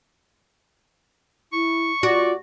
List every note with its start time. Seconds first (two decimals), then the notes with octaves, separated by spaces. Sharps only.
1.53 E4 C#6
2.03 F4 F#4 D5